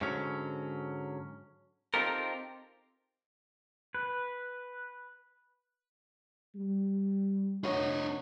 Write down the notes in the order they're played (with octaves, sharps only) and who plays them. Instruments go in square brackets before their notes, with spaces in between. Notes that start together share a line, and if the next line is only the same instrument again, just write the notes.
[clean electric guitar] G#2 D3 F#3 C#4
C4 D#4 F4 G4 A4 A#4
[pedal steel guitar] B4
[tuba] G3
[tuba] F1 [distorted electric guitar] D4 D#5 [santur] C#5 F#5